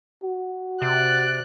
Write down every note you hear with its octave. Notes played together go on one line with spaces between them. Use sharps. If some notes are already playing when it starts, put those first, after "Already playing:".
F#4
C3 D5 F#6